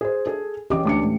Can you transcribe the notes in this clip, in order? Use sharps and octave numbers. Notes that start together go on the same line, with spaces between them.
G#4 C5
G#4 A4
E3 C#4 G4 D#5 D6
D2 D6 C#7
A2